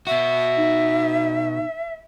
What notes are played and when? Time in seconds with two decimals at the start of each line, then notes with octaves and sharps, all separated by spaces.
0.07 B2 F#4 E5
0.57 D#4